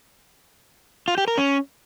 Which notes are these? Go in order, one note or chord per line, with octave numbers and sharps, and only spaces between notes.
F4
G4
A#4
C#4